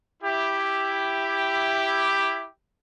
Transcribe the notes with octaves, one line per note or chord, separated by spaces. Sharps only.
E4 G4